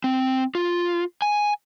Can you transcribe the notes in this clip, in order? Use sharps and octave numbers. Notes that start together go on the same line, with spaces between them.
C4
F4
G#5